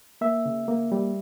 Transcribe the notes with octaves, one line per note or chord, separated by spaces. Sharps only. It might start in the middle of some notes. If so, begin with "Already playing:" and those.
A#3 E5
C#3
A#3
G3